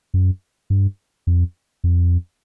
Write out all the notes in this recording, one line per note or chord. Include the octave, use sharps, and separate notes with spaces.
F#2
G2
F2
F2